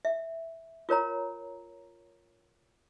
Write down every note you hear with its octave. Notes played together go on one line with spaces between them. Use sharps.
E5
F4 A#4 C#5 A#5